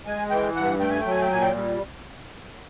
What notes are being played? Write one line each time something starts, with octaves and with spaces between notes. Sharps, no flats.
G#3 G#5
E3 G5
G2 F#5
A3 G5
G#5
F#3 G5
G#5
G5
A#2 G#5
G5
G3